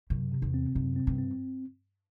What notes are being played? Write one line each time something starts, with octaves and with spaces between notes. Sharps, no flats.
F#2 C3
C3
E2
C4
F#2 C3
C4
G2
C4